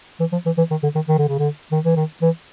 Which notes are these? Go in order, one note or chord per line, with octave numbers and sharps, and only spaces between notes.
E3
F3
E3
E3
D#3
D3
D#3
D#3
D3
C#3
D3
D#3
E3
D#3
E3